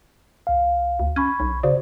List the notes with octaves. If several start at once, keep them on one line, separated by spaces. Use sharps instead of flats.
C2 F5
D2
C#4 B5 C#6 G#6
B1
C#3 F#4 C5 D5